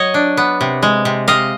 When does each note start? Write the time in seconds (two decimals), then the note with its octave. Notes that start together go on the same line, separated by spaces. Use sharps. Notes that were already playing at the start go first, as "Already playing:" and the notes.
Already playing: F#3 C#5 D#5
0.14 D4
0.37 B3
0.61 C3
0.83 G#3
1.05 C3
1.28 C3 D#5 F5